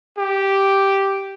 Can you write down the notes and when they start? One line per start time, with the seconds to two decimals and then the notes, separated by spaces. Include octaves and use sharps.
0.18 G4